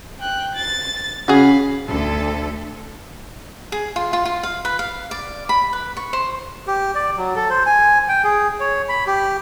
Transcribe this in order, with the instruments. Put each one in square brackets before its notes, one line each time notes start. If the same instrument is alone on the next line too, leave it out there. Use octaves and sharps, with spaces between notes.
[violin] G5 F#6
A6
[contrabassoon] C#3 [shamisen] F#4 G#4 [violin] F5 B5
[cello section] D2 A4
[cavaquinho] G#4
F4
F4
F4
F5
B4
F5
D5
B5
B4
C#6
C5
[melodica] G4
D5
F#3
A4
C5
G#5
G5
G#4
C#5
B5
G4